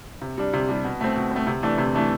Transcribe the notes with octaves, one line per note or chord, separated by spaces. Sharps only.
C3
G3 D4
C3
G3 D4
B2
A3 C4
B2
A3 C4
C3
E3 A3 D4
C3
E3 A3 D4